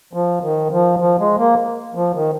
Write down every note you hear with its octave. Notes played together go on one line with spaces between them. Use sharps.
F3
D#3
F3
F3
G#3
A#3
F3
D#3